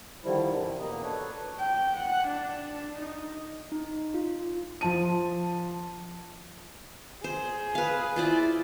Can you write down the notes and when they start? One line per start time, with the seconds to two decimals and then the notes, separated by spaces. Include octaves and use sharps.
0.24 D3 D#3 F3 G3 E4
0.51 F#2 C3 E3
0.80 E2 B2 A#3 D#5 A#5
1.03 D4 A4 B4 C#5
1.59 G5
1.97 F#5
2.28 D4
2.99 D#4
3.72 D#4
4.14 F4
4.81 F3 A5 D#7
7.24 G#4 C5
7.75 B4 F5
8.16 E4 F4 C5 D5